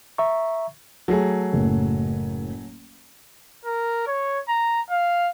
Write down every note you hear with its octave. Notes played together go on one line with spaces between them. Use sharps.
E5 A#5 C#6
F#3 A3 G#4
F#1 A2
A#4
C#5
A#5
F5